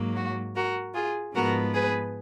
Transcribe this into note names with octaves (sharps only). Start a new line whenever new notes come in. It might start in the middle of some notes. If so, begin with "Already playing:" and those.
Already playing: G#2 F#3 A#3
F#4
F#4 A#4
F4 G#4
G#2 F3 G#3 B3 F#4 A#4
G#4 B4